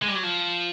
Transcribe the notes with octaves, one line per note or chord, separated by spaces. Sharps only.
G#3
G3
F#3
F3